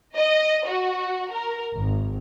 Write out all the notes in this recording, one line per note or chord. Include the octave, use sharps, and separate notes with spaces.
D#5
F#4
A#4
G#1